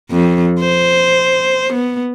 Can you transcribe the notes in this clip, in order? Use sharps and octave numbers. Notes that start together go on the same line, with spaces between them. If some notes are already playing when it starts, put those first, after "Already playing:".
F2
C5
B3